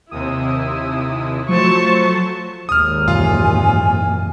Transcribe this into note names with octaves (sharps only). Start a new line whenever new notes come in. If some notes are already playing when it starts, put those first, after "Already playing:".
D#2 C3 E4 D#6
F3 F#3 A3 C5 A5 C#6
G#1 D#2 D#6 F6
F#2 A#2 E3 F4 G#5